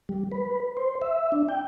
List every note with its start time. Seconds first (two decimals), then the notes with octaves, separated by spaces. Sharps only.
0.09 G3
0.32 B4
0.77 C5
1.02 E5
1.32 D4
1.49 G5